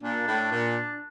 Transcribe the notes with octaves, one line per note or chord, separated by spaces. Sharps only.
A#2 D4
A2
A#2